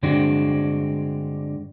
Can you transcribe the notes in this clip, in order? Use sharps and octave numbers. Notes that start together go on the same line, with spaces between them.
G2 D3 G#3 C4 D4 F#4